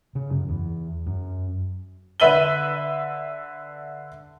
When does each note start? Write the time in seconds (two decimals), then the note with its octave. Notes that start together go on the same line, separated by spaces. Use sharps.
0.15 C#3
0.30 F#2
0.48 E2
1.06 F#2
2.20 D3 B4 E5 D#7 F#7 G7